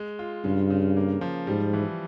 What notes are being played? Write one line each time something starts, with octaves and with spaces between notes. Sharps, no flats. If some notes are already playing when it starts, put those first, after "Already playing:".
Already playing: G#3
F4
G2 C#3
C#3
A#3
F3
G#2 G3
E3